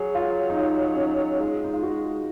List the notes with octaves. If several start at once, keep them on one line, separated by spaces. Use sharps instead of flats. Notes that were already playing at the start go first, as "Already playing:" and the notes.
Already playing: F#3 G#4
F4
D#4
F4
C#4
D#4
D#4
G#3 F4
D#4
F4
F#4